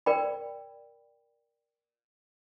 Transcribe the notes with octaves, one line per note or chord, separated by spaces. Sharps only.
A#4 D5 G5 B5